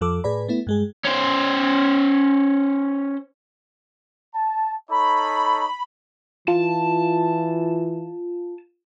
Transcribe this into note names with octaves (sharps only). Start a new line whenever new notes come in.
F2 F3 A4 D6 E6
A2 G#4 B4 D5 B5
A3 B3 E4
G2 G#3 G#4
C#4 C5
A5
D#4 A4 C#5 B5
E3 F4 A5